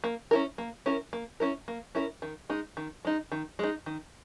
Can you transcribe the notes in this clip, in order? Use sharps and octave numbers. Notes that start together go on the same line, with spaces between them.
A#3
C#4 E4 A#4
A#3
C#4 E4 A#4
A#3
C#4 E4 A#4
A#3
C#4 E4 A#4
D#3
G#3 D#4
D#3
G#3 D#4
D#3
G#3 D#4
D#3